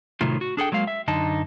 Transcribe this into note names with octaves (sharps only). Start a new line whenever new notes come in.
A2 C3 D#3 F#3 A3 F4
F#4
D4 G#4 A4 G5
F#3 G#3 A#3 F5
E5
F#2 D3 D#4 A5